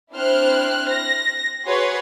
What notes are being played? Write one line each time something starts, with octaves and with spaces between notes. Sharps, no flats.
C4 D4 E4 C5 F6 F#6
A#6
F#4 G#4 B4 C#5 C6